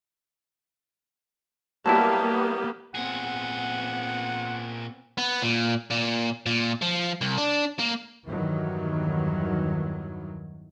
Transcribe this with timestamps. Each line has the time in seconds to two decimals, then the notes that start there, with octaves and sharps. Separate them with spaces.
1.86 F#3 G3 A#3 B3 E4 G4 A5
2.95 A#2 B3 C4 G#4 F#5
5.18 B3
5.42 A#2
5.90 A#2
6.46 A#2
6.82 F3
7.21 C2
7.37 D4
7.79 A#3
8.26 E2 G2 D#3 E3 F#3